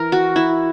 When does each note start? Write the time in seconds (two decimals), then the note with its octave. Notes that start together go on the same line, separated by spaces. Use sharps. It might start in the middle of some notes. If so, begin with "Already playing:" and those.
Already playing: E3 A#4
0.12 F#4
0.36 E4